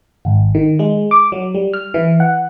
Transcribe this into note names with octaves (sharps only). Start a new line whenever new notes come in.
G#1
D#3
G#3
D6
F#3
G3
F6
E3
F#5